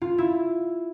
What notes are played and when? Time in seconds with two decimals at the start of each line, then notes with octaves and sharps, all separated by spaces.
0.02 F4
0.18 E4